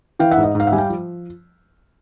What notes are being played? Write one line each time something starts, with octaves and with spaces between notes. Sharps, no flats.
E3 F5 G5
E5 F#5
G#2
D#5
G#2 F5
E5 F#5
G3 G#5
F5 G5
F3